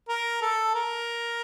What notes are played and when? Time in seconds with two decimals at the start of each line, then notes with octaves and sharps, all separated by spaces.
0.08 A#4
0.42 A4
0.75 A#4